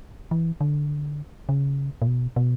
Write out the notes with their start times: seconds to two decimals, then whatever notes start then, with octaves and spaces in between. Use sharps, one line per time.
0.31 E3
0.61 D3
1.49 C#3
2.02 A#2
2.07 B2
2.36 B2